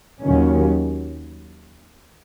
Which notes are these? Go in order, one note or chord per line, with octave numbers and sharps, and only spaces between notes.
D#2 D#3 F#3 C#4